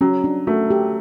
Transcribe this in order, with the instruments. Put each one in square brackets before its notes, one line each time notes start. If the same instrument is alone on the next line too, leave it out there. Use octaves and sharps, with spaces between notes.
[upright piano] F#3 [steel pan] C#4
[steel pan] D4
[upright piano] A3 [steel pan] F#4
[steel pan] G4